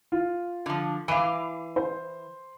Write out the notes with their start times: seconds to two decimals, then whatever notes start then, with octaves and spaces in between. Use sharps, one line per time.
0.12 F4
0.66 D3 F3
1.08 E3 F5 D6 D#7
1.76 C5